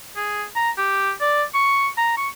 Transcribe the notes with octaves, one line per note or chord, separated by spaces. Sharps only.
G#4
A#5
G4
D5
C#6
A#5
C#6